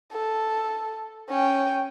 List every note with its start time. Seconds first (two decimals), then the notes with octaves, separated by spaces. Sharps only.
0.12 A4
1.29 C#4 G5